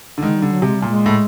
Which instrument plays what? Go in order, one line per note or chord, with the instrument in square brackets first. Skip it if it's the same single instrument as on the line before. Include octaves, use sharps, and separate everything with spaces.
[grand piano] D3
[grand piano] D#3 [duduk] G#3
[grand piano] D3 [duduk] G3
[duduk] F#3
[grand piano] C3
[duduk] G#3
[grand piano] A#2 [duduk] G3
[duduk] G#3
[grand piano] A2